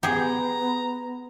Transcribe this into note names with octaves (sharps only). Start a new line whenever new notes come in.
B3 G4 G#4 A#5